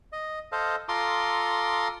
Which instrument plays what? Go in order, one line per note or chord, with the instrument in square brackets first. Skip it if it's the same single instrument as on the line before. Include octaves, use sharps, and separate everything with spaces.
[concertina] D#5
A4 C5 D#5 F5
F4 A4 A#5 C6 D6 D#6